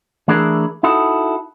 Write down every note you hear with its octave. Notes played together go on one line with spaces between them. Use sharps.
E3 A3 D4 E4 G#4 A#4
D#4 E4 F#4 A4